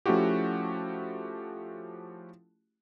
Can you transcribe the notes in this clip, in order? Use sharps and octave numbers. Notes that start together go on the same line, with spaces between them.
F3 A3 C#4 E4 F#4 G4